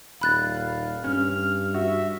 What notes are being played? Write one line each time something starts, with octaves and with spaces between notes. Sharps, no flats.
D#1 F5 B5 F#6 A6
G2 C#4 F6
F#4 E5